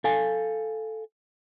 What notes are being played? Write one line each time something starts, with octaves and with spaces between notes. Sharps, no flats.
A4 F5 G#5